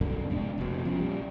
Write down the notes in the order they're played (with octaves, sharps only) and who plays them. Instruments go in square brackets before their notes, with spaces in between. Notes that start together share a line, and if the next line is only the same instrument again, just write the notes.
[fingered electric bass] C2 F#2 B2 D3
F1 G#2 D4
F1 B2
F3 C#4
A#1 G3